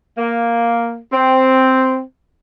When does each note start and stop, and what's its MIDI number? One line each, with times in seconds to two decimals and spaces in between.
0.18 0.97 58
1.12 2.01 60